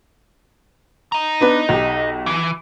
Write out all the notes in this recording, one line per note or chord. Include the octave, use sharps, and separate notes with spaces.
D#5 A#5
B3 D4 B4
B1 G4
E3